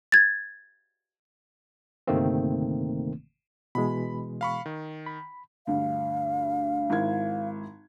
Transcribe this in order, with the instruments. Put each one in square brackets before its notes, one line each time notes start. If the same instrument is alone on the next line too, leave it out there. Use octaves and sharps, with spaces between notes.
[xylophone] G#6 A6
[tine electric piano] G1 C3 D#3 A3 A#3 C4
[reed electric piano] B2 E3 G#3 [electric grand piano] B5
[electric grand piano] F5 B5 C#6
D#3
[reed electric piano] B5
[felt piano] D2 G2 [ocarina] F5
[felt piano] G#1 E4 G#6